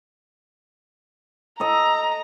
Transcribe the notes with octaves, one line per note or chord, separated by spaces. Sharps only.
A4 D#5 A#5